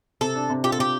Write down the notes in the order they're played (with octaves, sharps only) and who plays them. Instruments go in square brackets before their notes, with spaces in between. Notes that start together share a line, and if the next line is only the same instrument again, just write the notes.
[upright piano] C3 [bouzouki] A4
[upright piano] D4
C3
[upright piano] F4 [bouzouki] G4
[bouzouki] A4
[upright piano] C3 [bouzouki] G4